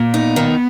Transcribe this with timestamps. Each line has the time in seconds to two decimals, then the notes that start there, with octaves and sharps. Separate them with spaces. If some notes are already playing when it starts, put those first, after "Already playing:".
Already playing: A#2
0.14 B3 D#4
0.36 D#3